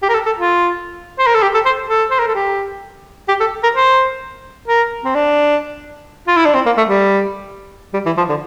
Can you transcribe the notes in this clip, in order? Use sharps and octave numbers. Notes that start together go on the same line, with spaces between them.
G4
A#4
A4
A4
F4
C5
A#4
A4
G4
A4
C5
A4
C5
A#4
A4
G4
G4
A4
A#4
C5
A#4
C4
D4
F4
E4
D4
C4
A#3
A3
G3
G3
E3
F3
D3